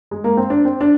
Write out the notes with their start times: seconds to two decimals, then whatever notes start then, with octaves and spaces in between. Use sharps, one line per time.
0.11 G#3
0.24 A#3
0.37 C4
0.50 D4
0.65 C4
0.81 D4